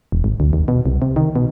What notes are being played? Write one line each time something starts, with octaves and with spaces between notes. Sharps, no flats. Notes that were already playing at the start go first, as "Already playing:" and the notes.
E1
G#1
D2
D#2
B2
C2
C3
D#3
B2